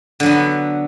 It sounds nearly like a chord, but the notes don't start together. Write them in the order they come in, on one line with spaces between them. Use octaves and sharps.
D3 F#3 B3